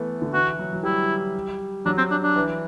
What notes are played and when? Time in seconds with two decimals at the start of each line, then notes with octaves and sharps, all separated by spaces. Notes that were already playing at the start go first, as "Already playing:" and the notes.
Already playing: E3 A3 B3
0.22 D3
0.33 E3 F#4
0.59 F#3
0.73 F#3
0.84 G3 E4
1.86 F#3 D4
1.98 C4
2.11 D4
2.23 D4
2.36 E3